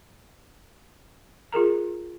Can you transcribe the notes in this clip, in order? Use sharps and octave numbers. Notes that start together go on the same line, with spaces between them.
F4 G#4 A#4 A#5